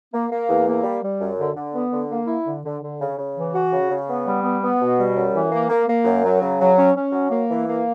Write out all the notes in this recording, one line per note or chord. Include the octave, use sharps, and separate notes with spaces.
A#3
A#3
E2
A#3
G3
G3
F#2
D3
D3
B3
D3
A#3
E4
D3
D3
D3
C#3
C#3
E3
F#4
C#3
C#3
B3
G3
B3
B3
B2
G3
F#2
E3
A#3
A#3
A#3
F#2
F#3
C#3
F#3
C#4
C#4
F#3
A#3
E3
A#3